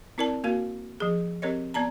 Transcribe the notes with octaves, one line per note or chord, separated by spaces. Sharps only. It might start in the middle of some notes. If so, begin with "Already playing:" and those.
C4 E4 A#4 D5 A5
A#3 F#4 A#4 F5
F3 G#4
C4 G4 A#4 C#5 D#5
B3 D5 A5 A#5